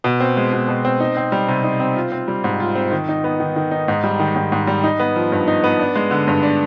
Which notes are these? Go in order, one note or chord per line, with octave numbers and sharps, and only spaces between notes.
B2
C4
G#3
B2
B2
C4
D#4
C4
G3
C3
D#4
C4
F4
C4
G3
G#2
F4
C4
D#3
D#4
B3
D#3
D#3
D#4
G#2
G3
D#3
G#2
G#2
G3
D#4
B3
F3
G2
D#4
B3
D4
G#3
D3
G2
D4